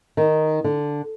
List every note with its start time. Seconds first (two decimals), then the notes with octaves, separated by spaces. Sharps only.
0.17 D#3
0.64 D3